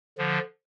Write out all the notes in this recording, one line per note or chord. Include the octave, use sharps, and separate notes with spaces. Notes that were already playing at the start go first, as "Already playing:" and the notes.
D3 F3